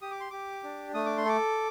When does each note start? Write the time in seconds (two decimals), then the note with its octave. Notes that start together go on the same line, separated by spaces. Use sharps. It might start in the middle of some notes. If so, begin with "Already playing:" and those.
0.02 G4 D#6
0.11 D6
0.20 C6
0.30 G4 D6
0.63 D4
0.94 A3 D#6
1.06 D6
1.17 C6
1.25 A4 D6